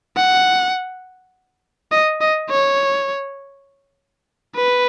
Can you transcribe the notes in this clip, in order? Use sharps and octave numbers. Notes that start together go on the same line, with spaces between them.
F#5
D#5
D#5
C#5
B4